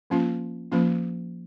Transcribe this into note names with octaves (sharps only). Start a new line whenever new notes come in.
F3 A#3 C#4 F4
F3 A#3 C#4 F4